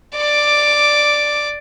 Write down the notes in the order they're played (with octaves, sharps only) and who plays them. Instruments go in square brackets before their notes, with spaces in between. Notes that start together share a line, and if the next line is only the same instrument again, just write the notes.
[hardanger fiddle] D5 D6